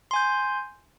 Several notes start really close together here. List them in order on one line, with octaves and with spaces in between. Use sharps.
C6 G#5 G6